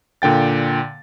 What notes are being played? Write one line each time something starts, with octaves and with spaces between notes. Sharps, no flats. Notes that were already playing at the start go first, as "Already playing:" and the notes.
A#2 D3 G5 A6